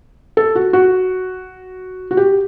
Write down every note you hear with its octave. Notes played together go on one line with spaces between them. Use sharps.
A4
F#4
F#4
F#4
G4